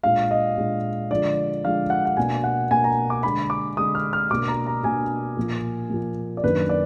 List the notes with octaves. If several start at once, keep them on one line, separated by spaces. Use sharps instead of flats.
A#2 G#3 D4 F5
D#5
A#2 G#3 D4
D3 F3 G#3 D4 D5
D3 F3 G#3 D4 F5
F#5
F#5
B2 A#3 D4 G#5
F#5
B2 A#3 D4 G#5
A#5
D6
D3 G#3 D4 B5
D6
D3 G#3 D4 D#6
F6
F6
B2 A#3 D4 D6
A#5
A#5
B2 A#3 D4 G#5
A#2 F3 A#3
A#2 F3 A#3
D5
F#2 D#3 A#3 D4 B4
D5